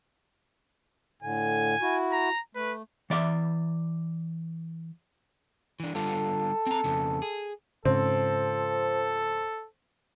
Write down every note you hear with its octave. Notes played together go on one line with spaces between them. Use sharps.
A2 D3 G#5
E4 F#4
A#5
A3 B4
E3 D5 E5
E3 D4
D3 G3 F4 A4
C4 A#5
F2 C#3
G#4
G#2 C#3 F3 C4 A4